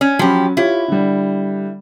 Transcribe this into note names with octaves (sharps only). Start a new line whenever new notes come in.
C#4
F3 F#3 C#4 G4 B5
E4 F4 G4 C#5
D3 G3